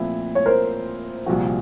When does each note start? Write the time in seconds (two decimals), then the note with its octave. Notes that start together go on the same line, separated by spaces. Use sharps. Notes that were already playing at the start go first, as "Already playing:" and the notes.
Already playing: A#2 F3 A3 C4 E4
0.35 C#5
0.46 A#4 C5
1.26 C2 A#2 F3 F#4